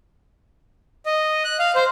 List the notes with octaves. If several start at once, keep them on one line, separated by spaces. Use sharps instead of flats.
D#5
F#6
F5
C5